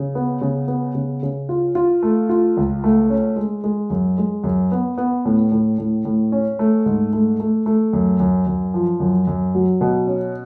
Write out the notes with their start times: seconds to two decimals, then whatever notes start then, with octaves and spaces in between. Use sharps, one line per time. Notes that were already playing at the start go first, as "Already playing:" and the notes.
Already playing: C#3
0.15 B3
0.41 C#3
0.68 B3
0.95 C#3
1.23 C#3
1.49 F4
1.75 F4
2.03 A3
2.29 F4
2.57 C#2
2.84 A3
3.10 C#4
3.36 G#3
3.64 G#3
3.90 F#2
4.18 G#3
4.44 F#2
4.72 B3
4.98 B3
5.25 A2
5.52 A2
5.78 A2
6.05 A2
6.32 C#4
6.59 A3
6.86 G#2
7.13 A3
7.40 A3
7.66 A3
7.93 F#2
8.20 F#2
8.47 F#2
8.74 F3
9.00 F#2
9.27 F#2
9.55 F#3
9.81 B2
10.07 C#4